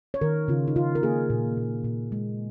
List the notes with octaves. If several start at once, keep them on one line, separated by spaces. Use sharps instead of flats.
C#5
D#3 A#4
C#3 F4
D#4
C#3 F4
A#4
A#3 G#4
A#2
A#2
A#2
G#3